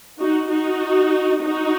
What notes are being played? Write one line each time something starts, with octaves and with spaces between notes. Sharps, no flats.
D#4 F#4
D#4 F#4
D#4 F#4